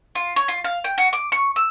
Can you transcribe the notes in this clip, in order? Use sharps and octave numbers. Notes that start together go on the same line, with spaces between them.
F4
C#5
F4
F5
G5
F#4
D6
C#6
E6